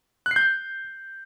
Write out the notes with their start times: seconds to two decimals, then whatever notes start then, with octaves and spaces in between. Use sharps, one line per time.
0.26 F#6
0.31 C7
0.36 G6